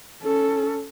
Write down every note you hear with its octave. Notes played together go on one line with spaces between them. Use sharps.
C#4 A4